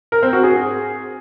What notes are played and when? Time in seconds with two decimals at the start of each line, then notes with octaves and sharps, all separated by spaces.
0.12 A#4
0.22 C4
0.33 F#4
0.43 G#4